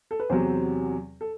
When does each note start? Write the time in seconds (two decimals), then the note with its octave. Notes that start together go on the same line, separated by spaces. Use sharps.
0.11 A4
0.20 B4
0.29 E2 C3 F#3 C4 C5
1.21 A4